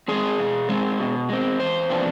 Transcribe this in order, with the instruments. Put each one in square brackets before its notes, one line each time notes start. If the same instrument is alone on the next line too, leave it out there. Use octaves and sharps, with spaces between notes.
[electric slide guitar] G#3 C4 G#4
B2
G#3 C4
B2
G#3 C4
E2 C5
C3 F3 B3 D4